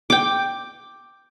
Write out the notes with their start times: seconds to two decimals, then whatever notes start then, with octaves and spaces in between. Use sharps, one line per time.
0.10 G5 D6